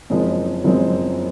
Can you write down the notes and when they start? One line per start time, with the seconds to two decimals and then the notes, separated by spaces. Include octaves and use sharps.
0.10 F#1 F#2 F3 G#3 C4
0.64 F#1 F#2 F3 G#3 C4